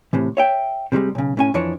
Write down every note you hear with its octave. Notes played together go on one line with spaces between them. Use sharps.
A2 C3 E3
C#5 E5 G5
C3 F3 G3 G#3
B1 C#3
A2 C#4 G#5
F2 E3 F3 D4 C#5